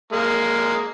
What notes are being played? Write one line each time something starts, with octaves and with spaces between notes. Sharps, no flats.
G#3 A#3